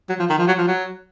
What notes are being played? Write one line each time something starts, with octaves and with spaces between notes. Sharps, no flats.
F#3
F3
D#3
F3
F#3
F3
F#3